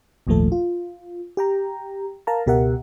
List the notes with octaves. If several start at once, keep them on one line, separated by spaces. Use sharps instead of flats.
G#1 D#2 A#2 F3 A3 A4
F4
G4 G5 A#5
A#4 F5 A5 A#5
C#2 B2 G4 A#4 E5 F#5